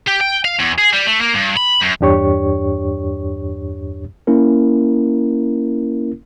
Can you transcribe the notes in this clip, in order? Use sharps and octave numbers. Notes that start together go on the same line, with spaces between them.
G4
G5
F5
E2
G#4
G3
A3
A#3
G2
B5
F#2
E2 G2 D4 G4 C#5 C#6
A#3 C#4 E4 A#4